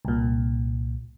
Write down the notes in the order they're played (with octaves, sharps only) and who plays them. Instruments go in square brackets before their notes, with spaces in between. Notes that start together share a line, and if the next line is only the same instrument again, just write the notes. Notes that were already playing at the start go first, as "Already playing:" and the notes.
[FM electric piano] C2 A#2